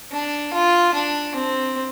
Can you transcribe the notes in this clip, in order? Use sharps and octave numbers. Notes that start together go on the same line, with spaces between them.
D4
F4
D4
C4